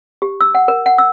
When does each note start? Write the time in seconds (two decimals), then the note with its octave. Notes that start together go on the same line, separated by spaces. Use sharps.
0.22 G4
0.41 E6
0.55 F#5
0.68 A#4
0.86 F#5
0.98 E6